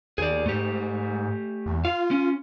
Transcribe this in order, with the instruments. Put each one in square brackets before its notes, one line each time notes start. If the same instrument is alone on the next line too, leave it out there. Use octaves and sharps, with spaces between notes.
[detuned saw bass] D#2 [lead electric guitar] G#4 D5
[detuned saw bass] G#2 [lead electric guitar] A3 G4
[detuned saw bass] E2
[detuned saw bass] F4 [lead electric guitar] F5
[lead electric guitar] C#4